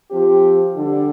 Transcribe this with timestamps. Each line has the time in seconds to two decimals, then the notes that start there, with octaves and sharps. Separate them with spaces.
0.11 F3 C4 G4
0.76 D3 G3 D4 G4